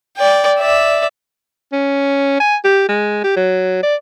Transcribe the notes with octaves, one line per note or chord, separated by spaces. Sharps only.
D5 G5
D5 E5
C#4
G#5
G4
G#3
G4
F#3
D5